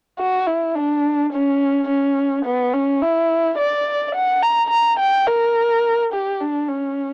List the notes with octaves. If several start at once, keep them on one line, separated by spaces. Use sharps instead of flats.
F#4
E4
D4
C#4
C#4
B3
C#4
E4
D5
F#5
A#5
A#5
G5
A#4
G4
D4
C#4